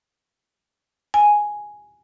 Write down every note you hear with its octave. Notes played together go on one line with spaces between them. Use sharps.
G#5